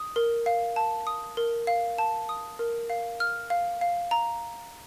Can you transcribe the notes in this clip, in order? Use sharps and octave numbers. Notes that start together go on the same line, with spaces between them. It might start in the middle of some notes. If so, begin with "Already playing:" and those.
Already playing: D#6
A#4
F5
A5
D#6
A#4
F5
A5
D#6
A#4
F5
F6
F5
F5
A#5